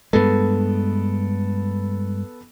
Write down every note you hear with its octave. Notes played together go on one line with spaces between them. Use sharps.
G2 G#3 B3 A4